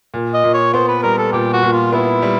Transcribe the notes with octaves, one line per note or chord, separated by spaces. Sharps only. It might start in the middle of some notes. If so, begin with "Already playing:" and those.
A#2
D#5
A#2
C#5
B3 C5
B4
G3 A#4
A4
A#2 G4
F#4
A#2
F4
B3 E4
G3